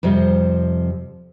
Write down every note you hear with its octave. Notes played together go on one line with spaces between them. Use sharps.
F2 C3 F3 G3